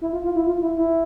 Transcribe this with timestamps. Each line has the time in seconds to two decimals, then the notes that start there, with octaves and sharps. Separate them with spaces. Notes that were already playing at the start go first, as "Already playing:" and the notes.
0.01 E4
0.13 F4
0.24 F4
0.36 E4
0.47 F4
0.62 E4
0.77 E4